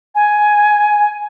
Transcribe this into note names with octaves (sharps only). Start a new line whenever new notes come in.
G#5